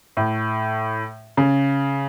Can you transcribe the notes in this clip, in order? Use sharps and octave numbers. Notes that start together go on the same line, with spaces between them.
A2
C#3